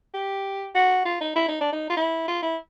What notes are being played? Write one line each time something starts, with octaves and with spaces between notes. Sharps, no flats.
G4
F#4
F4
D#4
E4
D#4
D4
D#4
F4
E4
F4
E4